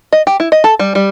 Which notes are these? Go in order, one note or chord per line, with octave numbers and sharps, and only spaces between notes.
D#5
G4
E4
D#5
A4
G3
G3